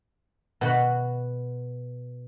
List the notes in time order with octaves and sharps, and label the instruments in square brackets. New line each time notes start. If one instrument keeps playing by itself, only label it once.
[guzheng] B2 F#4 B5